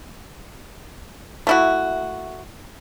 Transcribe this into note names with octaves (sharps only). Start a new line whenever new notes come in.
A3 E4 F#4